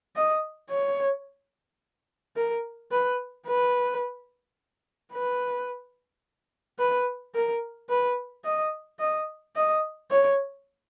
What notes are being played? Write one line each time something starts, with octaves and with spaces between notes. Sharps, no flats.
D#5
C#5
A#4
B4
B4
B4
B4
A#4
B4
D#5
D#5
D#5
C#5